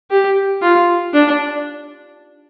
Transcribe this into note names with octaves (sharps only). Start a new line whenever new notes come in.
G4
F4
D4